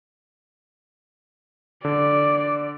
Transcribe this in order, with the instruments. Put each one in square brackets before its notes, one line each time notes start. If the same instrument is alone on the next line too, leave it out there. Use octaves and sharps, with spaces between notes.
[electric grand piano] D3 [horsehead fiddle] D5